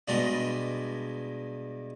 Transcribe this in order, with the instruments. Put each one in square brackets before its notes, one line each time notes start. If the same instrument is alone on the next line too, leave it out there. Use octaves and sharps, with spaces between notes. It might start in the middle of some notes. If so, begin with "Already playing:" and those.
[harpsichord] G2 B2 G#3 D4